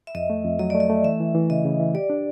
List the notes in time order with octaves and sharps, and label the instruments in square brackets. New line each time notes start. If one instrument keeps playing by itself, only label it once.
[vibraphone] E5
[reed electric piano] F2 [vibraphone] D#5
[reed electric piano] A3
F2
[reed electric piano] F#3 [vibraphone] D#5
[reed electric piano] A3 [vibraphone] D5
[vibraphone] D#5
[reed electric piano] A3
[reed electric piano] E3 [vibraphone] E5
[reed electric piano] E3
E3
[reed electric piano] C#3 [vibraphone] D#5
[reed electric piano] C#3
E3
[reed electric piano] G4 [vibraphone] D5
[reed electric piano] D4